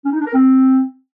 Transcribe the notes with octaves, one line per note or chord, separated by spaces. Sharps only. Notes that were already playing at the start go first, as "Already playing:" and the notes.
C#4
D#4
D4
A#4
C4